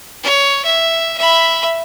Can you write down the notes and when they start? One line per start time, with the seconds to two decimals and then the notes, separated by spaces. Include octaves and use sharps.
0.23 C#5
0.65 E5
1.17 E5 B5